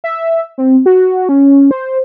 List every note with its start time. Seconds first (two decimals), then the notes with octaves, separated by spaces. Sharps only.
0.04 E5
0.58 C4
0.86 F#4
1.29 C#4
1.71 C5